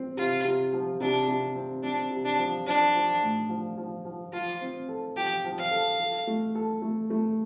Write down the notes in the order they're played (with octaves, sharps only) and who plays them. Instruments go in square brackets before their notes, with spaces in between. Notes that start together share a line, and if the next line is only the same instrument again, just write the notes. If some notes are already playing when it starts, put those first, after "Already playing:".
Already playing: [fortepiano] C4
[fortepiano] C3 [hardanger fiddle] F4
[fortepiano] C3
F3
[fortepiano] C3 [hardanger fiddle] D4
[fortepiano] C3
C4
[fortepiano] C4 [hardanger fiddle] D4
[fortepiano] C3
[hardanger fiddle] D4
[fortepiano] F3
[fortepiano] F3 [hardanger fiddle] D4
[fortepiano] F3
A2
F3
F3
F3
[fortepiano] F3 [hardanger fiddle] F4
[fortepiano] C4
A4
[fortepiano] F3 [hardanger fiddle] G4
[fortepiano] F3
[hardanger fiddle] F5
[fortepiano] A4
A4
A3
A4
A3
A3